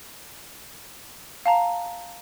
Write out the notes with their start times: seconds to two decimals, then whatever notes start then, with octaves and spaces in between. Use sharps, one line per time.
1.46 F5 A5 A#5